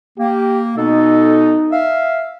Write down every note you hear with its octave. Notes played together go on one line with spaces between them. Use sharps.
A#3 G4
B2 B3 D#4 A4
E5 F5